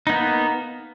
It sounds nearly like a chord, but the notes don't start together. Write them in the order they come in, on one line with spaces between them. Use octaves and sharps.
D#4 B3 A#3